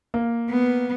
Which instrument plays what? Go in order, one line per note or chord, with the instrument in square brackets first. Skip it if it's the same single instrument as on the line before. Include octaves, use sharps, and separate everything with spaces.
[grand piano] A#3
[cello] B3